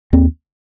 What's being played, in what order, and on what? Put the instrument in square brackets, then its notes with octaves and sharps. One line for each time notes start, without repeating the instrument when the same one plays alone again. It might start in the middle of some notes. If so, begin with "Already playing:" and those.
[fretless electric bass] D#2 C4